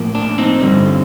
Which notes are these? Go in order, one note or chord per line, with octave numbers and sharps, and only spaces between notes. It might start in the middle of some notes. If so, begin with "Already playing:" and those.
Already playing: A2 F3 A#3
D4
C4 D#4
G2 D3 G3